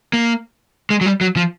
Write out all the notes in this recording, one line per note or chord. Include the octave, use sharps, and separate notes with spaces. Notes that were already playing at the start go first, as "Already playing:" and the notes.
A#3
G#3
F#3
G3
F#3
F3